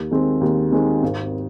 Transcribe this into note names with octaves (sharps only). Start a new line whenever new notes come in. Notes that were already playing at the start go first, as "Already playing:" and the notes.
Already playing: D#2
D#3 G#3 C4
D#2
D#3 G#3 C4
G#1